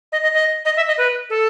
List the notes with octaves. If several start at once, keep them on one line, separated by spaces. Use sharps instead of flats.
D#5
D#5
D#5
D#5
E5
D#5
B4
A4